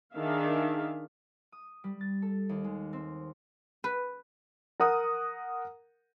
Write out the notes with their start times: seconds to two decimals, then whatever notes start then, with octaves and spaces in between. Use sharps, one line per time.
0.14 D#3 D4 G#4 E5 F5
1.52 D#6
1.84 G3
2.01 A6
2.22 A4
2.49 D#2
2.64 G#3
2.93 C4
3.84 B4
4.80 A#4 F#5 D#6